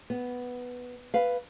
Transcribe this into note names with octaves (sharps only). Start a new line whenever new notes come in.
B3
B4 F5